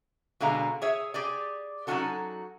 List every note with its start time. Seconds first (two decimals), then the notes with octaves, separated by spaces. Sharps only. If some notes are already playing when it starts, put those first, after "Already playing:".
0.40 B2 D3 G#3 F5 A#5
0.82 G#4 C#5 E5
1.14 G4 G#4 D5
1.87 F#3 C#4 D#4 F4 F#4 A4